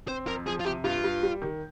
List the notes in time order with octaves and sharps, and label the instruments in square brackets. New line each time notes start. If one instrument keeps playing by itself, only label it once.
[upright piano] C4 [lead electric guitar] C5
[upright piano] F2 [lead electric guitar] A#4
[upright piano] F3 [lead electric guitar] G#4
[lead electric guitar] F4
[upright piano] C3 [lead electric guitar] G4
[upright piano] G2 [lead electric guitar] F4
[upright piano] G2
G3
D#3